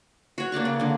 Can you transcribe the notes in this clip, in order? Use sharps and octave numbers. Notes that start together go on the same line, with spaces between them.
F#4 C#5
A#3 D4 D5 C#6
C#3
D3 A#3